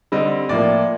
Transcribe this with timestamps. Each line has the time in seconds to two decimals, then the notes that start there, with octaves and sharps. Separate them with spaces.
0.12 D3 G3 C4 D#5
0.49 A2 F3 A#3 D5